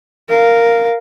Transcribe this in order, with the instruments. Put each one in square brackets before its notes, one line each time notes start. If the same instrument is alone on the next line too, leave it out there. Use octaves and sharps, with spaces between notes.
[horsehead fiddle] A#4 F5